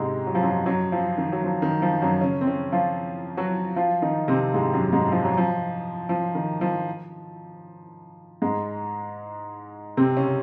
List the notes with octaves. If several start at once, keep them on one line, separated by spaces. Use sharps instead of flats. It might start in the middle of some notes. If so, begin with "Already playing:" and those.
Already playing: G#2 C3 G#3 C4
F#3
F3
F#2 F#3
F#2 F#3
F3
D#3
F#3
F3
D#3
F3
F#2 F#3
C#3 C#4
C4
C#3 C#4
F3 F4
F#3 F#4
F3 F4
D#3 D#4
C3 C4
G#2 G#3
F#2 F#3
G#2 G#3
F3
F#3
F3
F3
D#3
F3
G#2 G#3
C3 C4
C#3 C#4